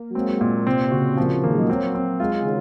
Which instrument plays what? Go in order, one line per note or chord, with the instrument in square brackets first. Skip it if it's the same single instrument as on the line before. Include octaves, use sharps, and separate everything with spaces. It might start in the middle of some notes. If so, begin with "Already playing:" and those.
Already playing: [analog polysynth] A#3
F#3
[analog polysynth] G#3 [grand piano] C4
[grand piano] A#2 [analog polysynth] F#3
[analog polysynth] C3 [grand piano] C4
[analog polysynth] C3
[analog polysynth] C#3 [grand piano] F#4
[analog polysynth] A#2 [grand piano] F3
[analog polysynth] C3
[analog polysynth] D#3 [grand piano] A#3
[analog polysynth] G#3
F#3
[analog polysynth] F#3 [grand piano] C4
[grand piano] C4
[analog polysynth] G#3 [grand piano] F4
[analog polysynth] F#3
C#3
D#3